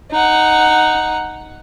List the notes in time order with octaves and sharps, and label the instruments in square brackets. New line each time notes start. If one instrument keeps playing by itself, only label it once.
[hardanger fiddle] D#4 F#5